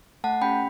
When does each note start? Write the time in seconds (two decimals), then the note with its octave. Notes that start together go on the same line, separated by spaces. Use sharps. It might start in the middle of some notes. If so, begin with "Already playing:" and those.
0.24 A3 F#5 A5
0.41 C#4 G4 G5 B5